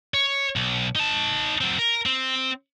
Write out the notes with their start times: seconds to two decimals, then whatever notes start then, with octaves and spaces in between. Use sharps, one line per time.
0.14 C#5
0.56 B1
0.95 D#4 A5
1.61 F#3 C4
1.79 A#4
2.06 C4